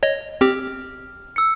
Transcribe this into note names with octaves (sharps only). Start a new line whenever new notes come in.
C#5 D#5
C4 G4 F6
E6 C#7